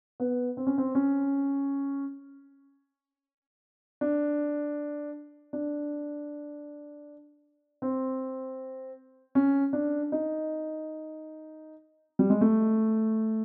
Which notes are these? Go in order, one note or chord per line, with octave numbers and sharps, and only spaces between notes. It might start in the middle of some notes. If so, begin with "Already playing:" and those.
B3
C4
C#4
C4
C#4
D4
D4
C4
C#4
D4
D#4
G3
G#3
A3